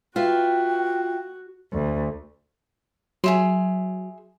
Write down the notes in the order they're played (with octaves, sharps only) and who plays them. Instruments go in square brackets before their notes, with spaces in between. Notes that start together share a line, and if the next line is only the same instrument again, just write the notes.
[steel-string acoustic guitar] F4 B4 E5 [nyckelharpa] F#4 [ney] G5
[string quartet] D2
[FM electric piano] F#3 [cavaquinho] G#4 E5 C6